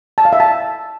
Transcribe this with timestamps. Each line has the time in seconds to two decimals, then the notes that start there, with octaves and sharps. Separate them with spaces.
0.18 A5
0.25 F5
0.33 E5
0.40 A5